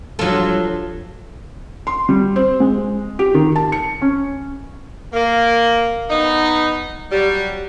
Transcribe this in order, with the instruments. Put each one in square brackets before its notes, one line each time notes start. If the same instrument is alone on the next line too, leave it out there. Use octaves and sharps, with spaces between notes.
[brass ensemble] G2 [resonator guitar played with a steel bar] F3 A4 [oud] F#3 F4
[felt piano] C6
G3
C4
G#3
G4
D#3
A5
C#7
C#4
[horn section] A#3
B3 D#4
F#3 G3